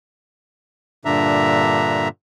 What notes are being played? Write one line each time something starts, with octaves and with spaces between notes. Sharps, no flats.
G2 A#2 D3 D4 E5 A#5